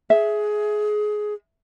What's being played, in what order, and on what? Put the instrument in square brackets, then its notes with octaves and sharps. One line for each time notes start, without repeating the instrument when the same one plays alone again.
[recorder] G#4 [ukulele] E5